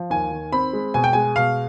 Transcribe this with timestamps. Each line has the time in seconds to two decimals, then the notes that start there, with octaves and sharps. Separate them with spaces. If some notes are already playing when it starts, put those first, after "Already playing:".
Already playing: F3
0.10 D#2 G#5
0.31 D#3
0.52 C4 B5
0.73 G#3
0.94 B2 G#5
1.04 G5
1.13 G#3 G#5
1.36 B2 F5